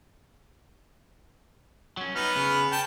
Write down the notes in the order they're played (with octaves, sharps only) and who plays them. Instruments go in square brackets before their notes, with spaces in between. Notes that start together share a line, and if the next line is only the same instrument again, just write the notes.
[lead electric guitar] F#3 C#4
[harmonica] B3 B4 F6 [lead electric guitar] D#4
[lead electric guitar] C#3
[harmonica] G5 A5